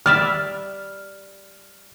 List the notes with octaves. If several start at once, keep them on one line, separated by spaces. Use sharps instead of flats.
G3 D5 E5 F6